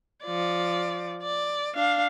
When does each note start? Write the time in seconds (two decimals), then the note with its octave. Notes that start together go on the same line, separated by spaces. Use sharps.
0.25 F3 D5
1.22 D5
1.75 D4 F5